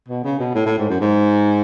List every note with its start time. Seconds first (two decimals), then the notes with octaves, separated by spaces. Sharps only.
0.08 B2
0.24 C#3
0.39 B2
0.55 A2
0.66 A2
0.78 G#2
0.90 F#2
1.01 G#2